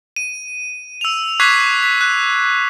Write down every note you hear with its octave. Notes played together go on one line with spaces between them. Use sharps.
D#7
E6 F7
C#6 D6 F#6 G#6 B6 C7
B6
F#6